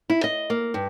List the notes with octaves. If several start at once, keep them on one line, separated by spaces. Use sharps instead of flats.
E4
D#5
A#3
G2